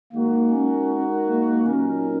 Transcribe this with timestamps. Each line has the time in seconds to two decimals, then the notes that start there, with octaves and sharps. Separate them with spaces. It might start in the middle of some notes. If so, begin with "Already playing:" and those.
0.12 D#3 G#3 A#3 D#4 F#4 A#4
0.50 C#4
1.27 A#3
1.65 A#2 F#3 C#4 D#4 A#4